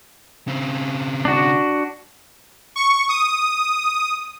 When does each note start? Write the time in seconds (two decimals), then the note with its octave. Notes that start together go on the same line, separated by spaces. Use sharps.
0.48 C#3 C4
1.25 D4 F#4
2.76 C#6
3.09 D#6